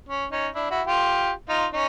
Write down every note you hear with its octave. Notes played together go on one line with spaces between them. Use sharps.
C#4
C#4 D#4
D4 E4
E4 F#4
F4 G4
D#4 F4
C#4 D#4